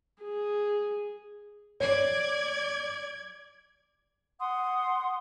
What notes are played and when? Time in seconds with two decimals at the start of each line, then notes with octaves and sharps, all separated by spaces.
0.23 G#4
1.80 C#5 D5 G#6
4.39 F#5 C6 D#6